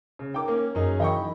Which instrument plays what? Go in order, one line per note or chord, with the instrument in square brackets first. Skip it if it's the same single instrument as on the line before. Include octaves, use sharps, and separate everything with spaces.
[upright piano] C#3
[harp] D#4 A#4 [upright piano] G5 D6
[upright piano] A#3 C#4
[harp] F#2 [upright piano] C#4 D#4 G#4
[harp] E3 B5 [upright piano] D#5 G5 C#6